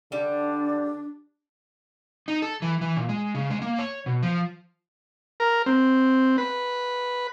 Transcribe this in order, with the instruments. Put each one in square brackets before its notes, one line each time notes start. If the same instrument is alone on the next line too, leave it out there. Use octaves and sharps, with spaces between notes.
[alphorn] D3 [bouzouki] G3 [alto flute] D4
[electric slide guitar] D#4
A4
E3
E3
A#2
G#3
C#3
G#3
A#3
C#5
B2
F3
[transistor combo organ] A#4
C4
B4